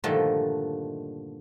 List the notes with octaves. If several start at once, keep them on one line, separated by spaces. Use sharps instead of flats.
G2 A#2 D3 D#3 F3 A3